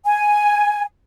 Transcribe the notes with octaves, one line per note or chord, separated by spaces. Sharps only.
G#5